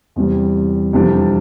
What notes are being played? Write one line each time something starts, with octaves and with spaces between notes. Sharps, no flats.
E2 C3 E3 G3
F2 C3 E3 G3 D4